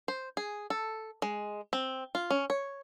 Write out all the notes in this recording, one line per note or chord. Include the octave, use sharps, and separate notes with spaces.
C5
G#4
A4
G#3
C4
F4
C#4
C#5